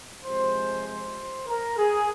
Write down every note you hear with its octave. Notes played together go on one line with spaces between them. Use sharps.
C3 F3 G#3 C5
C5
A#4
G#4